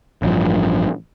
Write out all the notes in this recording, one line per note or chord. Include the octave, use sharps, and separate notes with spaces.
A1 G2 F3